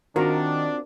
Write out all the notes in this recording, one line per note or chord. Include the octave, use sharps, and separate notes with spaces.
D#3 C4 D4 F4 F#4 A#4